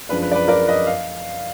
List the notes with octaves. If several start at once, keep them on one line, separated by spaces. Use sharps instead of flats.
F#2 F3 G#3 D4 B4
B4
D5
B4
A#4 D5
B4 D#5
F5